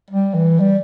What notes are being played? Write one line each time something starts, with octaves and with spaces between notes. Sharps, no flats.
G3
E3
G3